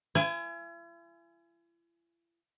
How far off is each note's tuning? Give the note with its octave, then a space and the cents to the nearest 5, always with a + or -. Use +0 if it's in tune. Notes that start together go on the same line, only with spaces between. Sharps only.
E4 +45 G#5 +0